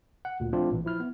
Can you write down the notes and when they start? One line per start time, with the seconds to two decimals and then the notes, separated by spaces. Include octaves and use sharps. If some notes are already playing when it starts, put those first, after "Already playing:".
0.25 F#5
0.40 D2 A#2
0.53 F3 A3 C4 D4 F4
0.71 A1 A#2 E3
0.85 F3 E4 F6
1.00 B3